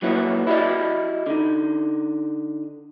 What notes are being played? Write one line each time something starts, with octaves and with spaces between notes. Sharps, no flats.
B1 F#3 A#3 E4 B4 C#5
E4 F#4 G4 D5 D#5
D3 D#4